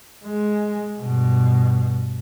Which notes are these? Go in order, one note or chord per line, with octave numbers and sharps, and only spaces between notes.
G#3
G2 B2